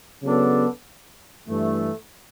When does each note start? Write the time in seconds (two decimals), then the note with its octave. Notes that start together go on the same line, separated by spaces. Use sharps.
0.23 C#3 F#3 B3 D4 A4
1.49 G2 E3 A3